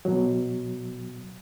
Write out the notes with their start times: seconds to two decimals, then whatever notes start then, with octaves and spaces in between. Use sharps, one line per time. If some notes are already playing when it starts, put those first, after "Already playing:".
0.05 B2 F#3